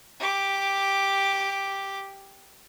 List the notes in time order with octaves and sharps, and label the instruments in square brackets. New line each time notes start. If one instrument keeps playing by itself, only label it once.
[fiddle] G4 D6